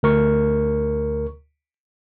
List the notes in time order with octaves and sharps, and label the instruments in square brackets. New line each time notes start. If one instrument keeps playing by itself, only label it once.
[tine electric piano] D2 A#4 C#6